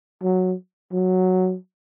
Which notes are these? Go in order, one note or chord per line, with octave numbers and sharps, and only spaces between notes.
F#3
F#3